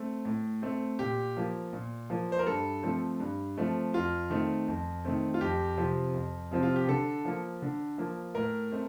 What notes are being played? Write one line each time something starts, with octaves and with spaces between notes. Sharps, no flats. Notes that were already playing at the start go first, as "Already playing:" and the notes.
Already playing: A3 C4
A2
A3 C4
A#2 G4
F3 A#3
A#2
F3 A#3
C5
A#4
G2 A4
F3 A3 C4
G2
F3 A3 C4
F2 F4
D#3 A3 C4
F2
D#3 A3 C4
F4
F2 G4
C3 F3 C4
F2
C3 F3 C4
F4
G4
D3 A4
F3 A#3
D3
F3 A#3
A2 A#4
A3 C4